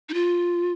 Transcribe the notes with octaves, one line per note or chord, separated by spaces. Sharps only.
D#4
F4